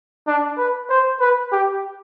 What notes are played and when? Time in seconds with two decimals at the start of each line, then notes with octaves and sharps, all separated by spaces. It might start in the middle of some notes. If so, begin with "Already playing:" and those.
0.28 D4
0.58 B4
0.90 C5
1.20 B4
1.52 G4